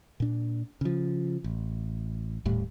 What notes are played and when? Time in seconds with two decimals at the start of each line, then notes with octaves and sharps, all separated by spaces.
0.20 A#2 D4
0.81 C#3 F3
1.44 A1
2.46 D#1 A2 G3